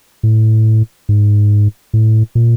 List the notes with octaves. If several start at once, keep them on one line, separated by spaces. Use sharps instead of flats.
A2
G#2
A2
A#2